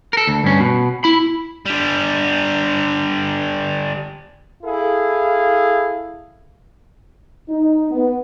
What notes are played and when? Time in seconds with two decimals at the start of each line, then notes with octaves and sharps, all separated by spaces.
0.13 A4 A#4
0.27 D2
0.44 G2 C#4
0.60 B2
1.04 E4 B5
1.66 D3 G3
4.63 E4 G#4 A4 F5
7.49 D#4
7.91 B3